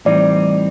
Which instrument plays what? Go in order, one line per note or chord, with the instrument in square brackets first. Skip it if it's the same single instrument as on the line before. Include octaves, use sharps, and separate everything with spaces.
[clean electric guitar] A2 E3 G3 C4 D#4 [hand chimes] D5